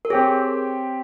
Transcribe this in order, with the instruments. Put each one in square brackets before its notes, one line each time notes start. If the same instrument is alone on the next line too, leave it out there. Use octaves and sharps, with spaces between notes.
[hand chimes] A#4
[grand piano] C4 G4 C#5 [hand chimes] G#4